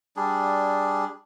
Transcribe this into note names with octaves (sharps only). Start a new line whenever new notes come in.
G3 D4 G#4